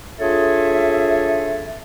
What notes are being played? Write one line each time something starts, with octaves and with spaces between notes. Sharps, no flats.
D4 F4 G#4 A4 C#5 E5